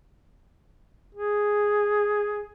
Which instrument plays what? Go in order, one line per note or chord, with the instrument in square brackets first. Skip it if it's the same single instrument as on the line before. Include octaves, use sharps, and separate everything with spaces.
[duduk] G#4